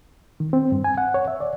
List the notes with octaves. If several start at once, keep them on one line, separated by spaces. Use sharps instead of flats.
D#3
C4
G2
G#5
F#5
C#5
E5
D5